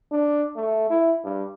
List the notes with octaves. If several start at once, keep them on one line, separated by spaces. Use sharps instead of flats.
D4
A3
E4
G2